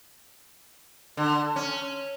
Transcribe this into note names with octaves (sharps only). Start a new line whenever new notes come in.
D3
C#4